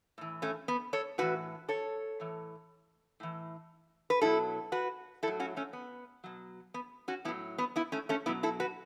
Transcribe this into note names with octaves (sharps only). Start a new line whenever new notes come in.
A2 E3
A3 C#4
B3
A4 C#5
A2 E3 F#4 B4
A4 C#5
A2 E3
A2 E3
B4
B2 F#3 E4 A4
F#4 B4
A2 F#3 E4 A4
C#4 F#4
A3 C#4
B3
B2 F#3
B3
C#4 F#4
A2 F#3 B3 E4
B3
B3 E4
A3 C#4
A3 C#4
B2 F#3 B3 E4
E4 A4
F#4 B4